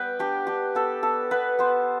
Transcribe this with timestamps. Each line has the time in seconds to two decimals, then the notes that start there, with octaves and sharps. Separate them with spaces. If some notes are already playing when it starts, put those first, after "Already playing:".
Already playing: G3 B3 B4 G5
0.19 D4 G4
0.47 D4 G4
0.75 B3 A4
1.03 B3 A4
1.31 B3 B4
1.59 B3 C5